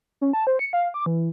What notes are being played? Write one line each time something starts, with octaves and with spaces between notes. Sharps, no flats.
C#4
A5
C5
C#7
F5
D6
E3